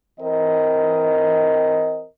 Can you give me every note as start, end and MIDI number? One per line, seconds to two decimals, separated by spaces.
0.20 2.06 52
0.20 2.06 60
0.20 2.06 70
0.20 2.06 75